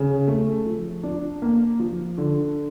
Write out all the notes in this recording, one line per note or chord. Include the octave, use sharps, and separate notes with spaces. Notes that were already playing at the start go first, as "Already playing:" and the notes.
Already playing: C#3
A3
F3
D4
A#3
F3
D3